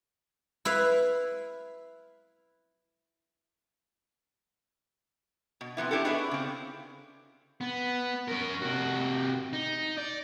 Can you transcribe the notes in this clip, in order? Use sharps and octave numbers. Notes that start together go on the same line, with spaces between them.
E4 B4 E5 F5
B2
C3 F3 B3 E4
C#4 D4 E4 G4 A4
B3 D4 D#4 F#4 G#4 B4
C#3 C4
B3
C#4 A#4
C3 F#4
D#4
D5